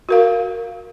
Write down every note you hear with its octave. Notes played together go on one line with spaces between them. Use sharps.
F#4 A#4 F5